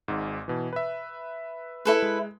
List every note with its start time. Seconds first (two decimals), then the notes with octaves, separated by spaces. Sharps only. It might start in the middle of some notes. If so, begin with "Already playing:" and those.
0.08 G#1 G#2
0.48 B2 E3
0.73 B4 E5
1.85 E4 A4 B4
2.02 G#3